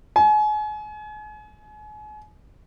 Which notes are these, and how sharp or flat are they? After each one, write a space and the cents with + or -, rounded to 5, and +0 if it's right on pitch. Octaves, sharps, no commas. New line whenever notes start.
G#5 +35